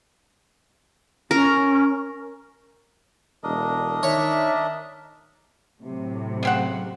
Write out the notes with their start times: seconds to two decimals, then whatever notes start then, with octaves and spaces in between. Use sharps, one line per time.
1.31 C#4 A#4
3.43 E1 D4 A#4 D#5
4.03 D#3 C#5 D5 E5
5.82 A2 C3 F#3
6.43 C#3 C4 F#5